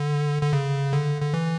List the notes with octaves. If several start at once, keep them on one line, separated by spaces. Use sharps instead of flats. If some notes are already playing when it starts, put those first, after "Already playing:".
Already playing: D3
D3
C#3
D3
D3
E3